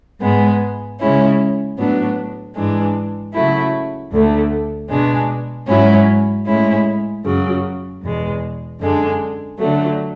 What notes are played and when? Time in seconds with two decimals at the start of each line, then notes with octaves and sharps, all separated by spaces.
0.20 G#2 G#3 B3
0.98 C#3 G#3 C#4 E4
1.77 A2 F#3 B3 D4
2.55 G#2 E3 G#3 D4
3.32 C#3 F#3 A3 E4
4.11 D2 D3 A3
4.89 B2 G#3 D4
5.67 G#2 F#3 C#4 E4
6.45 A2 G#3 C#4 E4
7.24 F#2 C#3 F#3
8.02 E2 B2 G#3
8.79 F#2 D3 G#3 D4
9.57 D3 F#3 A3